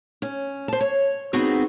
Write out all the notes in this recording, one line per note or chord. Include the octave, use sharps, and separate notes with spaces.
C#4
C5 A5
C#5
B3 C4 D#4 F#4 G#4